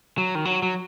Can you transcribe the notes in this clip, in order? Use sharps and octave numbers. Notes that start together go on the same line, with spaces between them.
F#3
D#3
F#3
F#3